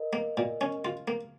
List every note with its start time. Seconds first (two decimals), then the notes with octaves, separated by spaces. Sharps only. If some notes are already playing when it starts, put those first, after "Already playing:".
Already playing: A#4 D#5
0.13 A#3
0.37 A#2
0.61 C#4
0.85 F4
1.08 A#3